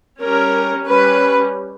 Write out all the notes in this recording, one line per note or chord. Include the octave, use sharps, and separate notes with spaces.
G3 C#4 A#4
G3 C#4 B4